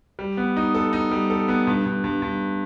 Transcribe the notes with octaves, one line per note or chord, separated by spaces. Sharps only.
G3
B3
D#4
A4
D#4
G3
A4
B3
G2
G2
G2
G2